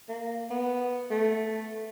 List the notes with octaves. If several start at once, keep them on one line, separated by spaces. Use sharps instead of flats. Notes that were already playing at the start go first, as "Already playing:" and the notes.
A#3
B3
A3